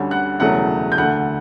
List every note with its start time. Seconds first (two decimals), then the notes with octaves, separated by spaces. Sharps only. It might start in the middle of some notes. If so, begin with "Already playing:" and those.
Already playing: D2 D3 G3 C#4
0.11 F#5 F#6
0.40 E1 E2 C#3 F#3 A3 F#5 F#6
0.92 G6
0.98 D2 D3 A3 F#5 F#6